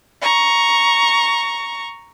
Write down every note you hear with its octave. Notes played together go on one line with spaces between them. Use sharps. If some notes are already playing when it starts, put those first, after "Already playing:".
A#5 C#6